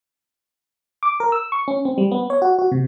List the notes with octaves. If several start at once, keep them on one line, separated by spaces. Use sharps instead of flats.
D6
A#4
E6
C#6
C#4
C4
G3
B3
C#5
F#4
F#4
C3